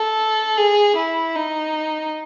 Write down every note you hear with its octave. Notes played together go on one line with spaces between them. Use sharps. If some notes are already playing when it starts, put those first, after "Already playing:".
Already playing: A4
G#4
E4
D#4